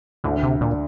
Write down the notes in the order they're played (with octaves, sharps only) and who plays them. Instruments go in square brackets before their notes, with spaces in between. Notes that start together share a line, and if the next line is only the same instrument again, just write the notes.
[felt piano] D2 [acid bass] D3
[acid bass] C3
[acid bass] A#2 [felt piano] D3